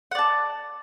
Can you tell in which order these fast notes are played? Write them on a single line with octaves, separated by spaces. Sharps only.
F#5 D5 A5